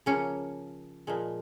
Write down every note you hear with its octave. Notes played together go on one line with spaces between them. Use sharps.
C#3 F3 A#3 C#4
A#2 F3 G#3